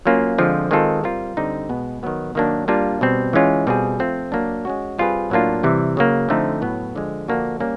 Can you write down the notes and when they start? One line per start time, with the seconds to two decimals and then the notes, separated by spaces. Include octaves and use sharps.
0.05 F#3 A#3 C#4 F4
0.38 D3 F3 G#3 C4 F4
0.71 D#3 G#3 C4 F4 A4
1.04 G3 C4 F4 A#4
1.37 D3 G3 C4 D#4
1.69 B2 G#3 B3
2.03 D#3 F#3 B3
2.35 D#3 F#3 A#3 D4
2.68 G3 A#3 D4 F4
3.01 B2 G3 C4
3.33 E3 G#3 C#4 F4
3.67 B2 G3 C4 F4 G#4
3.99 F3 A3 C4 F4
4.32 F#3 A#3 D4
4.65 G#3 C#4 F#4
4.99 G3 C4 F4 G#4 B4
5.30 A2 F#3 A#3 D4 F4
5.63 C3 E3 G3
5.97 C#3 F#3 A#3
6.29 D3 F3 A3 C4 D#4
6.62 A2 F#3 B3
6.96 D3 F3 G#3
7.28 D3 F3 A#3 D4 F#4
7.60 G3 A#3 C#4